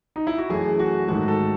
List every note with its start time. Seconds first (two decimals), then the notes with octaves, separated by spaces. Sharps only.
0.16 D#4
0.27 E4
0.38 F#4
0.49 F#2 E3 A3 G#4
0.79 F#4
1.08 G#2 D#3 F#3 A3 F#4
1.28 A4